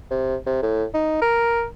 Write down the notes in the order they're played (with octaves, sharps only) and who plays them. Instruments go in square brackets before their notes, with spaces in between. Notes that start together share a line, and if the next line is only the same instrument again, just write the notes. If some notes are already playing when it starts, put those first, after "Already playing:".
[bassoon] C3
C3
A2
D#4
A#4